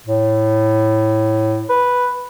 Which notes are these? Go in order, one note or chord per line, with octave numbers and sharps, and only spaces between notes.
A2
B4